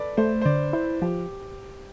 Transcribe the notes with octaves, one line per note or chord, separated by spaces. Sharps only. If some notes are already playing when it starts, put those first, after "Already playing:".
Already playing: A4 B4 D5
A3 C5
C5
D3 D5
E4 C5
F3 G4